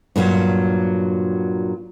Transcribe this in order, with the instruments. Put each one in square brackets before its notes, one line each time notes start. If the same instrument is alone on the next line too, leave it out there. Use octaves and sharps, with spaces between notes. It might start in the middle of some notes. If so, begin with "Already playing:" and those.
[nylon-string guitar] G2 A#2 F3 F#3